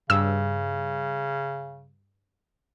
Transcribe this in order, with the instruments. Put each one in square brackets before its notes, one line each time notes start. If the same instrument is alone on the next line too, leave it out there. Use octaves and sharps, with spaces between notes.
[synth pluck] G2 [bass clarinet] C#3 [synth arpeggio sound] E6